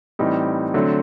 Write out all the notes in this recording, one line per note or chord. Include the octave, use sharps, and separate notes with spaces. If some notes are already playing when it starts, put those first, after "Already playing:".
A2 E3 G3 C4 D#4
D3 F#3 A3 C4